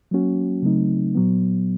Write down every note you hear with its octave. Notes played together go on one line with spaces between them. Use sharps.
F#3 A#3 C#4 F#4
C#3 F#3 A3 C4 D#4
A#2 F#3 B3